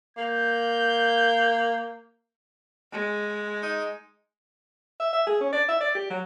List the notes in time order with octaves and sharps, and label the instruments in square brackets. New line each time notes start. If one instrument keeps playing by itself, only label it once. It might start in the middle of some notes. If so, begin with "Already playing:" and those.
[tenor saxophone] A#3 [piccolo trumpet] G6
[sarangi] G#3
[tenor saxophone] D#4
[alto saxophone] E5
E5
G#4
C#4
D5
E5
D5
G4
F#3